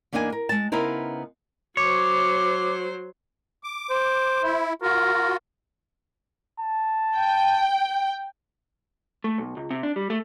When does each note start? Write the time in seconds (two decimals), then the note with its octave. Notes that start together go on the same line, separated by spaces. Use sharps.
0.13 E2 A#3 D4 D#4 D#5 G#5
0.32 A#4
0.49 G#3 A5
0.72 C#3 B3 D#4 E4 A#4 C5
1.77 F#3 C5 C#5 D6
3.64 D6
3.90 C5
4.43 E4
4.82 F4 F#4 A#4
6.61 A5
7.17 G5
9.24 A3
9.38 B1
9.57 C#2
9.71 C3
9.83 D4
9.96 G3
10.10 A3